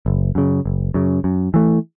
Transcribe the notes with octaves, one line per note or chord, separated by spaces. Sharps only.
F#1
F#2 C#3
F#1
F#2 C#3
F#2
E3 A3